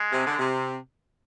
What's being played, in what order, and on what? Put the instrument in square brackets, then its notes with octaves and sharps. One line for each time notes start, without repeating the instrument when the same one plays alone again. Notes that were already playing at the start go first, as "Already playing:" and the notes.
Already playing: [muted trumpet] G#3
[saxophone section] C3
D3
C3